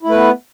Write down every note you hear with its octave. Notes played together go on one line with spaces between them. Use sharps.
A3 B3 E4 B4